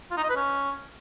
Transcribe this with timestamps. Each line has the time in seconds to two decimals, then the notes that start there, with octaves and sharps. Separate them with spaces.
0.11 F4
0.17 D#4
0.23 D#5
0.30 B4
0.36 C#4